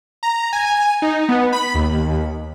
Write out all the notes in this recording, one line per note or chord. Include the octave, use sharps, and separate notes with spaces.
A#5
G#5
D#4
B3
B5
D#2